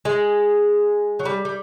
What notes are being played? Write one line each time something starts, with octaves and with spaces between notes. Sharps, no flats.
G#3
F#3
G3
G3